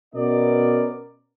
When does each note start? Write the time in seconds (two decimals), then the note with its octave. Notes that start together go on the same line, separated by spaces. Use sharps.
0.15 B2 B3 C#4 A#4 D5 D#5